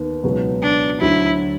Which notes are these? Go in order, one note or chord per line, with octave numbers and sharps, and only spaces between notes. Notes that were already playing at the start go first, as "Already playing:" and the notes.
Already playing: D#2 D#3 B3
C#2 B2 F#3 B3
D4
D2 D3 F#3 E4